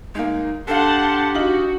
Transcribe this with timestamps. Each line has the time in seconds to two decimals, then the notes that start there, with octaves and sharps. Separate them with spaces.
0.15 G#3 A#3 D#4
0.68 D4 G4 A4 F5 F#5 A5 C6
1.35 D#4 F4 F#4 F#7